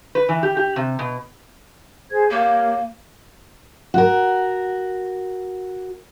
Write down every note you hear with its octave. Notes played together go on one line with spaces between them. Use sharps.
B4
E3
G4
G4
C3
B2
G#4 C5 G#6
A#3 G4 A#4 C#5
F#4 A#4